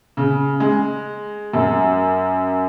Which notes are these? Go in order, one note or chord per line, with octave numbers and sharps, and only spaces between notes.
C#3
G#3
F#2